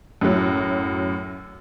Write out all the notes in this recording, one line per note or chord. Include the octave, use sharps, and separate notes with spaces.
F#2 A2 F#3